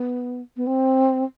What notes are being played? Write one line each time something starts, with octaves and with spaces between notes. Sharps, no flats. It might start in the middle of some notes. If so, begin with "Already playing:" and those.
Already playing: B3
B3
C4